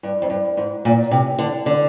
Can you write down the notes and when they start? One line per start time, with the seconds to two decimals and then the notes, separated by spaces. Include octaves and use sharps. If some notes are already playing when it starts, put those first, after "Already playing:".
0.03 G2
0.22 F2
0.30 G2
0.57 G#2
0.85 A#2
1.11 C3
1.39 D3
1.66 D3